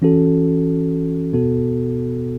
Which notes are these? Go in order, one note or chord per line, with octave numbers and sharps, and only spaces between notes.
E3 C#4 F#4 A4
B2 B3 F#4 A4